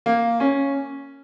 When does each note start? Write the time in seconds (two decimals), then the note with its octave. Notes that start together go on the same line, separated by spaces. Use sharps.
0.06 A#3
0.40 C#4